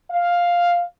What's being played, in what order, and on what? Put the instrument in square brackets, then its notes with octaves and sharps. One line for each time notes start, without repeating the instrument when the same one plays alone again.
[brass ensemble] F5